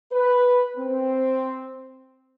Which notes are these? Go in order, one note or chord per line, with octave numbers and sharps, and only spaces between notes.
B4
C4